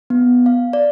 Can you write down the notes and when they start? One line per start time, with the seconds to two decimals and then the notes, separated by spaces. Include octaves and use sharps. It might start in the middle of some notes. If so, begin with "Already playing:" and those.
0.10 B3
0.46 F5
0.73 D5